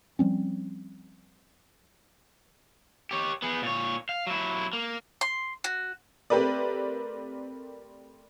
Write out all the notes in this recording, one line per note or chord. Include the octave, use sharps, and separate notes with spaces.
F3 G3 C4 C#4
G4 C#5
B3 G#4
A#2 C#5
F5
F#3 E4
A#3
C6
F#4
A3 C4 G4 A#4 B4 D5